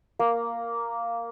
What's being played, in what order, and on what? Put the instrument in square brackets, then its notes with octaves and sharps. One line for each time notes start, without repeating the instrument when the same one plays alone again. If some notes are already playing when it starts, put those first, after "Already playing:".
[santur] A#3